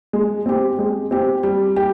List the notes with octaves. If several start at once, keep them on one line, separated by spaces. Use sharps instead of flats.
G#3
C4 G4
G#3
C4 G4
G3
G4